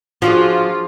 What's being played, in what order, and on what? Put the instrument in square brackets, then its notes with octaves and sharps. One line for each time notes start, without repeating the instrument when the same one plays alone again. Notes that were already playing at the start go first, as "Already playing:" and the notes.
[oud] F3 [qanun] D4 F#4 G#4 [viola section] F4